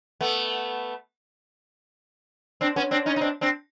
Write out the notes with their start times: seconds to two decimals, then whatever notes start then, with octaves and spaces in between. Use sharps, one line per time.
0.21 A3 B3
2.61 C4 D4
2.76 B3 C#4
2.91 C4 D4
3.06 C#4 D#4
3.16 D#4
3.21 C4 D4
3.41 C4 D4